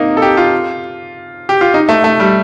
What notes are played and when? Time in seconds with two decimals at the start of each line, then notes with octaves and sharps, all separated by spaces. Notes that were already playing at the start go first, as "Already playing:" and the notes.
Already playing: A#3 C4 D#4
0.17 A4
0.22 G4
0.37 F4
1.49 G4
1.61 F4
1.74 D#4
1.89 A3
2.04 A3
2.20 G3